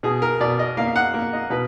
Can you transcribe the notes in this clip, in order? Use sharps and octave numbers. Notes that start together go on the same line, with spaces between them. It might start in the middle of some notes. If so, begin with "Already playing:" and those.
B2 G#4
A#4
B2 D5
D#5
A#3 F5
F5
F#5
A#3
D#5
B2 B4